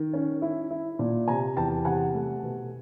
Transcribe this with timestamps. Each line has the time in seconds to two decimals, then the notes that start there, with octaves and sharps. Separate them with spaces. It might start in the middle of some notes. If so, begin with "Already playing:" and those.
Already playing: D#3
0.13 C#4
0.42 E4
0.71 E4
0.99 A#2
1.28 C3 G#5 A#5
1.57 E2 G5 A5
1.85 C3 F#5 G#5
2.14 A3
2.43 B2